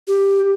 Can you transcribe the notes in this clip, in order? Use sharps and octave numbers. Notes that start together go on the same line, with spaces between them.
G4